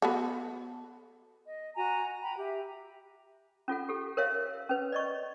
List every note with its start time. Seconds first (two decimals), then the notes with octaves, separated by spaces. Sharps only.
0.02 B3 F#4 A4
1.46 D#5
1.75 F#4 G#5 A#5
2.21 G5 A#5 B5
2.37 G4 E5
3.68 C#4 F4 A4 F#5
3.89 G4 A4
4.17 A#4 C#5 E5 F5
4.69 C#4 B4
4.92 D5 D#5 C#6